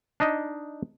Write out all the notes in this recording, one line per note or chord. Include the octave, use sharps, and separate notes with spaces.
D4 D#4 D#5